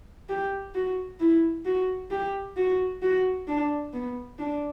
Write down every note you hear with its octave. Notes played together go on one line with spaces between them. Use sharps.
G4
F#4
E4
F#4
G4
F#4
F#4
D4
B3
D4